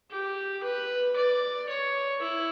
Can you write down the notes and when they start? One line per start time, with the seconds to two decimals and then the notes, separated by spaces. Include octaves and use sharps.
0.11 G4
0.63 B4
1.16 D5
1.69 C#5
2.21 E4